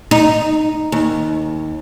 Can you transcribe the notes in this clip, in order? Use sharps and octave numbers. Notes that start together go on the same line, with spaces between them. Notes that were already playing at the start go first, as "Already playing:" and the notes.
D#4
D#2